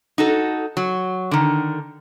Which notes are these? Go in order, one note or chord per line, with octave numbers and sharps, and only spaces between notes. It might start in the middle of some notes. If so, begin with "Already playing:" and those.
D#4 F#4 A4
F#3
D3 D#3